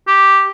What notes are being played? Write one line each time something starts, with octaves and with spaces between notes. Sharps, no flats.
G4